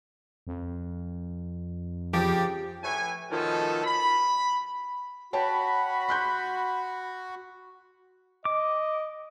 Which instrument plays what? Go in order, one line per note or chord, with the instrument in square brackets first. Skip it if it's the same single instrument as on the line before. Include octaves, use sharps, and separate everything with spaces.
[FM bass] F2
[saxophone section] C#3 G4 [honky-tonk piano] F3
[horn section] A2 B4 C#5 G#5
B2 D#3 F3 A3 C#4 A4
B5
[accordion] F#4 [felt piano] C#5 G5 A5 [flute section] B5
[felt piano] C6 F#6 G6
[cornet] D#5 [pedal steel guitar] D6